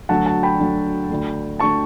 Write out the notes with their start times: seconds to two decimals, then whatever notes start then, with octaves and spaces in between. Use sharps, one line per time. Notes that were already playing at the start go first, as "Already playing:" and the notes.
0.09 D2 D3 F#3 A3 F#5 A5
0.26 F#5 A5
0.43 G5 B5
0.59 D2 D3 F#3 A3
1.09 D2 D3 A3
1.59 D2 D3 A3 A5 C#6